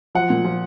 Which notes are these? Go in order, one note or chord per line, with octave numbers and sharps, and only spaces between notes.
F3 F#5
A#2
F3